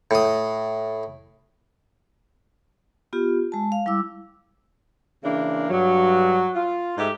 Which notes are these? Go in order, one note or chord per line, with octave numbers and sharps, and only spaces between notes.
A2 D#6
B3 F4 G4
G#3 A5
F5
G3 E4 D6 E6
C#3 E3 A#3 D4
G2 F#3
F4
G#2 A3 G4 D#5 E5